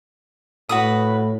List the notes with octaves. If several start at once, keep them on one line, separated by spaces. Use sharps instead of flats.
A2 F#4 B4 D#6